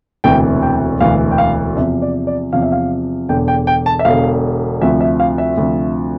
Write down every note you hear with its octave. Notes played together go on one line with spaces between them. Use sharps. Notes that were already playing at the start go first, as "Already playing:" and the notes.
E1 D2 C3 E3 G5
G5
E1 D2 C3 E3 F5
G5
F5
E2 C3 F3 E5
D5
D5
E2 C3 F3 F5
E5
F5
E1 E2 D3 G5
G5
G5
A5
E5
E1 E2 D3 F5
D2 C3 F3 E5
E5
F5
E5
D2 C3 F3